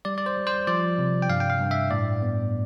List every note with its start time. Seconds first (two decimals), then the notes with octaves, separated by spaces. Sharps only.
0.05 G3 D5
0.18 D5
0.26 C5
0.37 G3
0.47 C5
0.67 F3 D5
0.99 C3
1.22 G5
1.29 G2 F5
1.40 G5
1.50 F5
1.60 G2
1.71 E5
1.91 A2 D5
2.22 B3